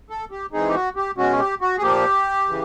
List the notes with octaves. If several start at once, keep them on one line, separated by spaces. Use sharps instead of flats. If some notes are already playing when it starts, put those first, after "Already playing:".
A4
G4
E3 G#3 C4 D#4 G#4
G4
F#4
G4
B2 G#3 C#4 F#4
G4
F#4
G#4
A#2 F3 A#3 G4
C#3 E3